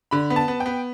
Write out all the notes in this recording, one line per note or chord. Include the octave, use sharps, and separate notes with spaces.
D3 B5
B3
A5
B3
G5
B3